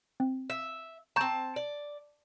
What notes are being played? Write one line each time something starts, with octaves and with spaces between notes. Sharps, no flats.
C4
E5
C4 A5 A#5 C#6 G6
D5